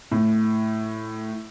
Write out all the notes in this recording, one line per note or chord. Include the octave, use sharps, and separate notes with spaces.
A2